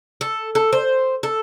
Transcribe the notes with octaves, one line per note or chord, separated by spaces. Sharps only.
A4
A4
C5
A4